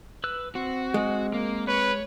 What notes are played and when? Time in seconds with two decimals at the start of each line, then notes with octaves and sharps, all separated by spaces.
0.24 B4 E6 F#6
0.55 C4 F#4
0.94 G#3
1.34 A#3
1.68 B4 C#5